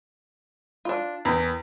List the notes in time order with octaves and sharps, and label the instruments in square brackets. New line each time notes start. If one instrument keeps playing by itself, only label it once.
[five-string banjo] D4 F4
[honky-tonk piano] E2 [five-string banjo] A#4 G5